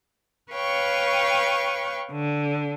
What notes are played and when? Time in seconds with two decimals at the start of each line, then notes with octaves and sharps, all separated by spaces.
0.53 B4 C#5 F5 G5 C#6
2.13 D3